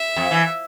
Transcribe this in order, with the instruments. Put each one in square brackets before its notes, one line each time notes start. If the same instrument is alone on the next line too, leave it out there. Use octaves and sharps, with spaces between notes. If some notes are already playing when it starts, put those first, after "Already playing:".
Already playing: [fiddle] E5
[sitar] F2
E3